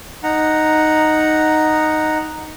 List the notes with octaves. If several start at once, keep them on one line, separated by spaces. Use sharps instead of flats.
D#4 F#5 A#5